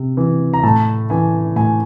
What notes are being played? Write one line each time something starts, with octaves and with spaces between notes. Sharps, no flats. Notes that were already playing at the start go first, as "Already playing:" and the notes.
Already playing: C3
E3
A#5
A2 A5
E3 G#5
A2 G#5